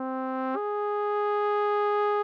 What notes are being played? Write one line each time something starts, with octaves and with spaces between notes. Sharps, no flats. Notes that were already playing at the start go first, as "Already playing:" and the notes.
Already playing: C4
G#4